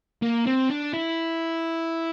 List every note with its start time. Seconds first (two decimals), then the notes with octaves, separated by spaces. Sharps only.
0.23 A#3
0.47 C4
0.70 D4
0.94 E4